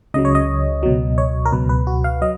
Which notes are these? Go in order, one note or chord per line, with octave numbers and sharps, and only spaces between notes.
C#2 C#3 F#3 D#5
C#5
D#5
C#2 B2 F#3
C#5
A#4
C#2 B2 F#3 B4
B4
F#4
F5
F#3 D#5